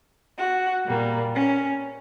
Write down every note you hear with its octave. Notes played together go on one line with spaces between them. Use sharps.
F#4
A#2 G3 A#3
C#4